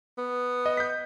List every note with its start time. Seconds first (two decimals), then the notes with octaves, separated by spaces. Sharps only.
0.18 B3
0.66 D#5
0.77 G6 B6